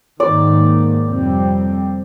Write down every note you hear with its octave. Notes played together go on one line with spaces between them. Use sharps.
G#2 D#3 A#3 D5
F2 C3 G3 C4